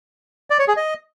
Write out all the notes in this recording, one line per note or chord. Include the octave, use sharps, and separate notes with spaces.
D5
C#5
G#4
D#5